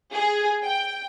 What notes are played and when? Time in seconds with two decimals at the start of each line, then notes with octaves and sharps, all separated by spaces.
0.14 G#4
0.64 G5